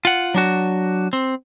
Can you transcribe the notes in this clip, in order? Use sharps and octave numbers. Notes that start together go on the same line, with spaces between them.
F4 F#5
F#3 D4 F#4
C4